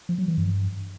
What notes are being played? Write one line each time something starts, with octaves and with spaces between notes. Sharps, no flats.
F3
F#3
E3
G2